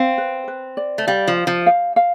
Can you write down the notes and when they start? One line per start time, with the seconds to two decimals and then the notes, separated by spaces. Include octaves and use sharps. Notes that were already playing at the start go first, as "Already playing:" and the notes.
Already playing: C4 F5
0.18 B4
0.48 B4
0.77 D5
0.98 A3
1.07 G3 F5
1.28 F3
1.37 F5
1.47 F3
1.66 F5
1.96 F5